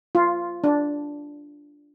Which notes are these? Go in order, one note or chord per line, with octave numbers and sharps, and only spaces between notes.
F4
D4